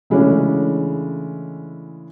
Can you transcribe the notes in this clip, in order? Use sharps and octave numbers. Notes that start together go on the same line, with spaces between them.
C#3 E3 G#3 A3 C#4 D4